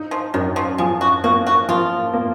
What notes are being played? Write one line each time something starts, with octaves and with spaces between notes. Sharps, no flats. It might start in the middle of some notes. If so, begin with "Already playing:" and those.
Already playing: D#4
F3
F#2 D#3
F3
F3 G#3
F#4
A#3 F#4
F#4
F3 F4
A#3